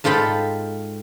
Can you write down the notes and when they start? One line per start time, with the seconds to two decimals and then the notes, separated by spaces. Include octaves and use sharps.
0.04 G#2 F4 A4 G5 B5